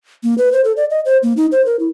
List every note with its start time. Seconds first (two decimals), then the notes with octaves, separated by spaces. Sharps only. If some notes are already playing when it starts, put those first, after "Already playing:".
0.23 A#3
0.38 B4
0.52 C5
0.64 A4
0.77 D5
0.90 D#5
1.05 C5
1.23 A#3
1.37 D#4
1.52 C5
1.66 A#4
1.79 E4